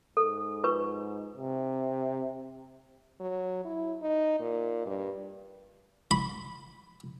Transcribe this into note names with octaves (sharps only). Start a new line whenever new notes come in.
G#2 A4
F4 B4 C#6
C3
F#3
E4
D#4
A#2
G2
B5